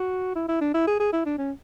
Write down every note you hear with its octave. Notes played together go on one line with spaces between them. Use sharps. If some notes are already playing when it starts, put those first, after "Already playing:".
Already playing: F#4
E4
E4
D4
E4
G#4
G#4
E4
D4
C#4